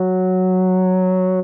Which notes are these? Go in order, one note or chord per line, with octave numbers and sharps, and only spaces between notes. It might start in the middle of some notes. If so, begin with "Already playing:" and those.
Already playing: F#3